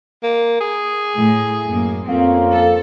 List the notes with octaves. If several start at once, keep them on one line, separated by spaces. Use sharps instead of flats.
A#3
G#4
A2
F#2 A#3
F2 A#3 C4 C#4 F5
A4